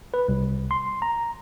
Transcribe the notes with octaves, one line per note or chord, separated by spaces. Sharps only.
B4
C2
C6
A#5